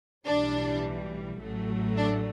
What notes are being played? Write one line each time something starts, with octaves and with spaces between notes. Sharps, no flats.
B1 A2 E3 G3 D4
A1 A2 F#3 A3
D4